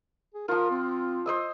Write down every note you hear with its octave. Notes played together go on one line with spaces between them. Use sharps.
G#4
F3 F4 A#4
C4
C5 D#5 E6